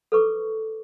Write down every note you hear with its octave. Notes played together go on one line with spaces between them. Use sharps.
A4 B4 C#6 D6